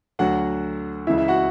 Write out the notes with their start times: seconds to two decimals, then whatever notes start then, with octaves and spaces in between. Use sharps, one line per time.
0.19 D2 D3 F#3 F#4 F#5
1.07 C#2 C#3 E3 E4 E5
1.18 E4 E5
1.28 F#4 F#5